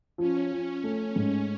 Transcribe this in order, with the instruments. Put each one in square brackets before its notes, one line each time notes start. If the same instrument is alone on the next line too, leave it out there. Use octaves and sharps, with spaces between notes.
[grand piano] F3 [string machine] C#4
[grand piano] F3
A3
G#2